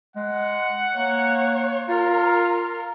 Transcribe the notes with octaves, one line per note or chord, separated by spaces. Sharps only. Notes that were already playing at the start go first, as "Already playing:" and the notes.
G#3 F#5
A#3 C#5
F4 A#4 F5